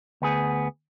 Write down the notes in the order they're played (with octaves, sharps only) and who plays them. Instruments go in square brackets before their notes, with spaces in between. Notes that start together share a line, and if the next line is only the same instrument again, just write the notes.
[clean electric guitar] D2 B3 G#4